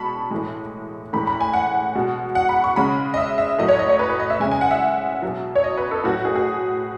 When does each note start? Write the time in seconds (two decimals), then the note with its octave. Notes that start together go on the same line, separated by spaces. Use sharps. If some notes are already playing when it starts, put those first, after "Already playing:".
Already playing: B2 G#3 A5 B5 C#6
0.31 A2 E3 G#3
1.13 A2 E3 G#3 B5
1.27 B5
1.41 G#5
1.53 F#5
1.95 B2 G#3
2.35 F#5
2.49 B5
2.64 C#6
2.76 C#3 G#3 B5
3.14 D#5
3.17 E5
3.38 E5
3.59 A2 F#3 D#5
3.68 C#5
3.79 D#5
3.89 C#5
3.99 B4
4.09 B4
4.20 D#5
4.30 E5
4.40 C#3 G#3 G#5
4.51 G#5
4.61 F#5
4.71 E5
5.22 B2 F#3
5.55 C#5
5.64 D#5
5.77 B4
5.91 A4
6.04 A2 F#3 F#4
6.25 G#4
6.35 G#4